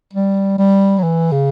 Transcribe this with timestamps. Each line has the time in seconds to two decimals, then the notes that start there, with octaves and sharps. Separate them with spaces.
0.14 G3
0.59 G3
0.99 F#3
1.03 E3
1.32 C#3